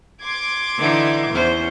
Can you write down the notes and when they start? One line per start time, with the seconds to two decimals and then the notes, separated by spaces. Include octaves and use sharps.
0.23 C6 D6 G#6
0.78 D3 E3 D#4
1.31 E2 C#4 C5